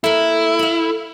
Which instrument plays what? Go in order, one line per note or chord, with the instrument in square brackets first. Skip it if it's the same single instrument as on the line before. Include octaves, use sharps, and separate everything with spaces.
[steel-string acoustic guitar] A#3 A4 [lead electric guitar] E4
[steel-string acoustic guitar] A4 F5